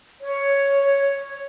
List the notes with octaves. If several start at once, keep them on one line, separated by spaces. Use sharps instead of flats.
C#5